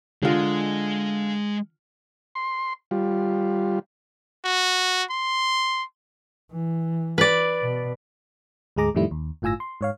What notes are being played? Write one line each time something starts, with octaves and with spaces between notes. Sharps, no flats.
D3 G#3 F4
C6
G3 F4
F#4
C6
E3
B4 D5
B2
D2 G#2 G#3 G#4 A#5 D6
F2 A2 D#3 G3 A3 E4
D#2
G1 A2 F4 G#5 E6 A#6
C6
G#2 C#5 F5